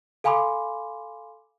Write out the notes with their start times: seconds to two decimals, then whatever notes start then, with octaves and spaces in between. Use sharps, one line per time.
0.24 A4 F5 G#5 B5 C6 D6